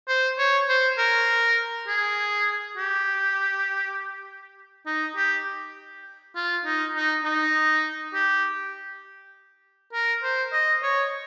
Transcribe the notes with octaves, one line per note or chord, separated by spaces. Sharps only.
C5
C#5
C5
A#4
G#4
G4
D#4
G4
F4
D#4
D#4
D#4
G4
A#4
C5
D#5
C#5